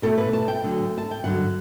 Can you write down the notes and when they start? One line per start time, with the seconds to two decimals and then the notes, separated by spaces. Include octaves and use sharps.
0.02 B2 A3 E4 A4
0.18 B4
0.33 A5
0.48 G5
0.63 D2 D3 F#3
0.98 A5
1.11 G5
1.24 G2 D3 F#3 F#5